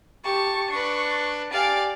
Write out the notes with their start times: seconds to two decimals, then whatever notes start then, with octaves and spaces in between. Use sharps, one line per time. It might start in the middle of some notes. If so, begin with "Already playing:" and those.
0.24 G4 A5 C#6
0.70 D4 B4 C#6
1.51 G4 D5 F5 G#5